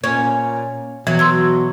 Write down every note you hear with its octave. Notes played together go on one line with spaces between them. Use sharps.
A#2 C#4
B2 E3 F#3
C6 E6 G#6